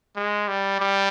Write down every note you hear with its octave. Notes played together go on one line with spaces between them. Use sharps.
G#3
G3
G3